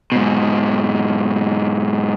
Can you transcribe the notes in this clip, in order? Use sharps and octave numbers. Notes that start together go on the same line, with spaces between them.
G#2 B2